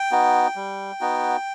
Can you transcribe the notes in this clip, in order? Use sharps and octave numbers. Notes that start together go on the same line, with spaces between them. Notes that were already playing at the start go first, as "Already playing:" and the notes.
Already playing: G5
B3 D#4 F#4
G3
B3 D#4 F#4